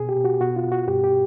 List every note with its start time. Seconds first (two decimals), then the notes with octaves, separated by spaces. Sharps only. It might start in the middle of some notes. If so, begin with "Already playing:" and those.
Already playing: B2 G#4
0.09 G4
0.16 B2
0.25 F#4
0.41 B2 F#4
0.56 F4
0.64 B2
0.72 F#4
0.88 G2 G4
1.04 G4